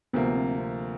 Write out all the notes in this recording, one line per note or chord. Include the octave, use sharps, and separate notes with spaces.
D2 C3 F3 A#3 B3
C4